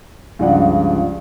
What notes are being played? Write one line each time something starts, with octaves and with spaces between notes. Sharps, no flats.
C#2 G2 F3 G#3 D5 F#5